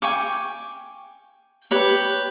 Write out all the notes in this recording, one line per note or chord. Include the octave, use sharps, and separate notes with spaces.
G5 G#5 C#6 D6
G4 B4 C#5